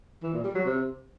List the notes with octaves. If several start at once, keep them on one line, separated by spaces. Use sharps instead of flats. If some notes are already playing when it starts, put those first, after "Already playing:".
E3
A#2
G3
F#3
C3